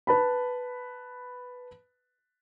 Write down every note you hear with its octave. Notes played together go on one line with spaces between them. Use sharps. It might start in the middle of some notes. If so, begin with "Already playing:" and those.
B4 A5 B5